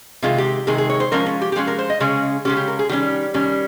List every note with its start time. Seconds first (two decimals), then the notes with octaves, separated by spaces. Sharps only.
0.22 C3 D#3 G#3 F4
0.38 G4
0.67 C3 D#3 G#3 G#4
0.78 G#4
0.89 C#5
1.00 C5
1.12 F3 G#3 C#4 A#4
1.26 C#4
1.42 G4
1.52 G4
1.56 F3 G#3 C#4 G#4
1.67 A#4
1.79 C5
1.90 D#5
2.00 C#3 G#3 C#4 G#4
2.45 C#3 G#3 C#4 G4
2.56 G4
2.68 A#4
2.79 G#4
2.89 D#3 G3 C#4 G4
3.34 D#3 G3 C#4